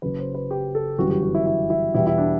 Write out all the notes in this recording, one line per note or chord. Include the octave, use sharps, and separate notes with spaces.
F#1 F#2 F#3 B4
C5
B4
G4
A4
G1 F#2 E3 G3 F#4
G4
F#4
E4
E4
E4
E2 B2 G3 E4
E4
D4